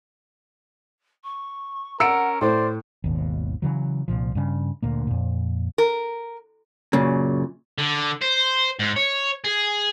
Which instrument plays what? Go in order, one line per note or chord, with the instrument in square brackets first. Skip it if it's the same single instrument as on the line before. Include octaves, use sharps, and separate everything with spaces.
[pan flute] C#6
[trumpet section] C#4 A#4 [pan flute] F#5 [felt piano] E6 C#7 D7
[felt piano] A2 [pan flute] C5 [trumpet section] D5 C6
[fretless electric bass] G#1 D#2 B2
C#3 E3 F#3
C2 A#2 F3
G2 C#3
D2 A#2 A#3
F2 A#2
[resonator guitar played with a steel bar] A#4
[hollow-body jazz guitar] F#2 A#2 C#3
[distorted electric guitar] D3
C5
G#2
C#5
G#4